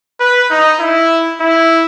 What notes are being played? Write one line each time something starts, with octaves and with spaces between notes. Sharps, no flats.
B4
D#4
E4
E4